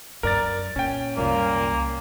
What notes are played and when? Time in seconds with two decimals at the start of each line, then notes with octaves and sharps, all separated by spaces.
0.23 F#2 A#4 D5 A6
0.76 A#2 C#4 G5
1.17 C2 F#2 A#2 A#3